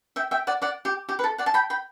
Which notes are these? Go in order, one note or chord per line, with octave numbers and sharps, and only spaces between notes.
E5 G5
E5 G5
D5 F#5
D5 F#5
G4
G4
B4
A4
D5 F#5
A5
G5 B5
G5 B5